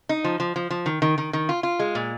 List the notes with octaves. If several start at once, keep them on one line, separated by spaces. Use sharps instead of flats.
D#4
F3
F3
F3
F3
D#3
D#3
D#3
D#3
F4
F4
G#3
A#2